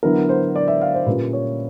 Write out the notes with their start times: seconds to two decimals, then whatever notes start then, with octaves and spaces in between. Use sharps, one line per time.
0.03 D3 F#3 B3 E4 A#4
0.29 C5
0.55 D5
0.68 E5
0.81 F5
0.94 C5
1.06 A#2 G3 A#3 C#4 F4 B4
1.33 C#5